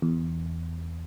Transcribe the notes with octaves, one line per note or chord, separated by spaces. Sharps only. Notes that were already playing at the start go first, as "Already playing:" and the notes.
E2